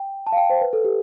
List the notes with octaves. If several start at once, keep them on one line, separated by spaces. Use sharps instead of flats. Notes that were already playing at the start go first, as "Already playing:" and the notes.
Already playing: G5
A5
F5
G5
C5
B4
A4
G4